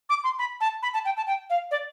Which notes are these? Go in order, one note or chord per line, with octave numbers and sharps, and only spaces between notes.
D6
C6
B5
A5
B5
A5
G5
A5
G5
F5
D5